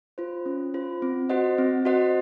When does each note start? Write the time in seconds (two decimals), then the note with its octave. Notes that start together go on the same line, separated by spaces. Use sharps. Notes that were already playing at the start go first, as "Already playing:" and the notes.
0.18 F4 C5
0.46 C#4
0.74 F4 C5
1.02 C4
1.29 F#4 C5 D#5 F#5
1.58 C4
1.85 F#4 C5 D#5 F#5